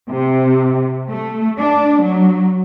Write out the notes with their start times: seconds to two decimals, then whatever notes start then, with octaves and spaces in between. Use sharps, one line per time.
0.11 C3
1.10 A3
1.60 D4
2.03 F#3